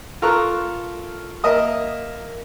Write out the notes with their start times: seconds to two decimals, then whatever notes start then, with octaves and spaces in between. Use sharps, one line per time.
0.22 F4 A4 A#4 A#5 C#6 F#6
1.44 A#3 A#4 D#5 E5 D#6